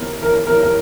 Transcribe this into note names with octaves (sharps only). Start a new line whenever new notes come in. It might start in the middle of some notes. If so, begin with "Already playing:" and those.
Already playing: B2 A#4
A#4
A#4
A#4